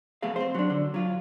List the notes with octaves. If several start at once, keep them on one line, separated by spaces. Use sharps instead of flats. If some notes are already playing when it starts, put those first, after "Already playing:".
F2 A3 B3 G#4 F5
C4 C5
F#3 D4
D3
F#3 F4